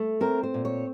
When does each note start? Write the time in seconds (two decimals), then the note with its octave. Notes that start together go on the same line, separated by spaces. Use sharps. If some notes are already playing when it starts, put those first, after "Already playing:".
Already playing: A3
0.21 C4 A#4
0.43 C5
0.54 A#2
0.65 C#5